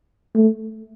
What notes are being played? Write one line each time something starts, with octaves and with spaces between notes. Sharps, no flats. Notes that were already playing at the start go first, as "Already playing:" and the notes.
A3